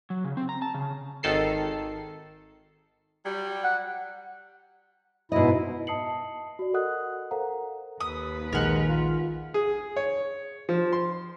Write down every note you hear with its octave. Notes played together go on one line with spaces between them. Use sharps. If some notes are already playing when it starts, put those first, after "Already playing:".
F#3
C#3
C4
A#5
A5
C#3
G#1 D#3 A4 C7
F#3 G3
F#5
G#2 B2 E4 D#5
D#5 A5 D#6 C7 C#7 F#7
F#4 D5
A4 A#4 D#5 F#5 D#6 F#6
A4 A#4 C5 F5 F#5 A#5
D#2 B4 D#6
A#1 D#3 G#3 A#4 F#5 F6
F4
G#4
C#5
F3
C6